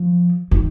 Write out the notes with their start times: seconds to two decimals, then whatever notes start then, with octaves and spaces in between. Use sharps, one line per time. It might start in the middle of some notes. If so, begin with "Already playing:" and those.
Already playing: F3
0.51 D#3